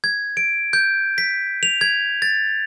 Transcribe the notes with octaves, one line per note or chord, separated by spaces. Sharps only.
G#6
D7
G6
B6
F7
G#6
A6